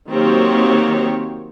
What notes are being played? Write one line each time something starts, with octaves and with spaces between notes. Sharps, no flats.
D#3 F#3 A#3 C4 G4 C#5